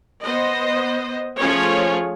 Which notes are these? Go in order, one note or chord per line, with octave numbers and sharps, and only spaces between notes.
B3 C5 D#5
F3 A3 C#4 F4 G#4 C#5